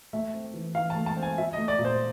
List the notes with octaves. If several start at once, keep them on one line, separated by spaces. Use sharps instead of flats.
A3 E5
C4
E3
E3 F5
A5
A3
A5
C4
G#5
F3 E5
D#5
A3
D5
A#2
C5